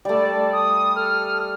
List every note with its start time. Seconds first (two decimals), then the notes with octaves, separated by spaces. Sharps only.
0.05 G3 A3 D5 A5
0.53 D#6
0.96 A4 F6